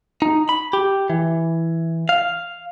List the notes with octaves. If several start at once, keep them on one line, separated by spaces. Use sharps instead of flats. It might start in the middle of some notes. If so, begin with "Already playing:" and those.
D#4
B5
G4
E3
F5